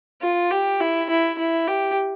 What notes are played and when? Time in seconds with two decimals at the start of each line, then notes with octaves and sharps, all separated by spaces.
0.23 F4
0.51 G4
0.81 E4
1.09 E4
1.39 E4
1.68 G4